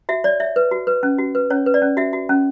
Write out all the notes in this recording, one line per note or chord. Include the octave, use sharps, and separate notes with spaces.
F#4 E5
C#5 D5
C#5 E5
B4
F#4
B4
C#4
F#4
B4
C#4 C#5
B4
D5
C#4
F#4 E5
F#4
C#4